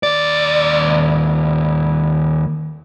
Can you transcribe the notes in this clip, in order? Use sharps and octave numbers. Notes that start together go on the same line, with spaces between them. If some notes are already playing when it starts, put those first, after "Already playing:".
D#2 D5